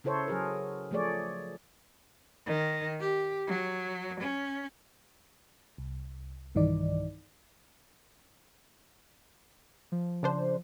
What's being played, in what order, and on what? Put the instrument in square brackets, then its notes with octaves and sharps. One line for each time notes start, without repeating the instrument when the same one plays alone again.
[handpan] C#3 E4 A4 C5 C#5
F#3 G#4 A#4
F3 A3 G#4 C#5 D5
[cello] D#3
G4
F#3
C#4
[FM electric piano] C2
B1 G2 D#3 E3 D#4 D5
[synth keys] F3
[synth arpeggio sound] C#3 D4 C5